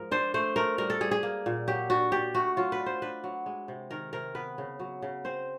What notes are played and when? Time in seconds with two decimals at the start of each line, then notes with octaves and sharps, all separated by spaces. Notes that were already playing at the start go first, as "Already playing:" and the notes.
Already playing: G#2 F3 A#4
0.11 D4 C5
0.34 A3 C5
0.56 A3 A#4
0.78 G3 A#4
0.90 A4
1.01 G3 G#4
1.11 G#4
1.23 A#3
1.46 A#2
1.67 F#3 G4
1.90 D4 F#4
2.12 D4 G4
2.34 A3 F#4
2.57 F#3 F4
2.72 B4
2.79 D4
2.86 C5
3.02 D4 B4
3.24 F#3
3.46 G#3
3.68 C3
3.91 D#3 A#4
4.13 C3 A#4
4.35 B3 B4
4.58 C#3
4.80 F#3
5.02 C#3
5.25 C4 C5